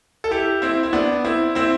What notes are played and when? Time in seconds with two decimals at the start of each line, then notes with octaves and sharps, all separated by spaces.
0.24 A4
0.31 E4 G4
0.62 C4 E4
0.83 E4
0.93 B3 D4
1.25 C4 E4
1.55 C4 E4